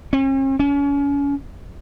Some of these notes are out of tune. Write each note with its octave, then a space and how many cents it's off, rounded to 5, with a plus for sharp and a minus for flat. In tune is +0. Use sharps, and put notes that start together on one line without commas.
C#4 -45
C#4 +35